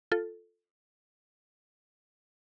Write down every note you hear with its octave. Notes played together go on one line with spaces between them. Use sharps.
F4 A4